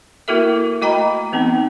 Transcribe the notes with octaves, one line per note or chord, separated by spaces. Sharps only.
A#3 E4 F#4 A4 A#4 E5
A3 F#4 D#5 G5 A#5 B5
E3 B3 C4 D#4